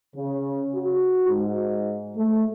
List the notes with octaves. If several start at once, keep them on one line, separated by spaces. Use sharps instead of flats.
C#3
F#4
G#2
A3